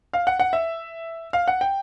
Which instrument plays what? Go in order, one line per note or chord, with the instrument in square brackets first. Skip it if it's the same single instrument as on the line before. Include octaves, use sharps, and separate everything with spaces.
[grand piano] F5
F#5
F#5
E5
F5
F#5
G5